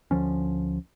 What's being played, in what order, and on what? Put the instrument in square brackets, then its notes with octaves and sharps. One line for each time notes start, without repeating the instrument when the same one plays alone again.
[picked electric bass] D2 D3 F3 C#4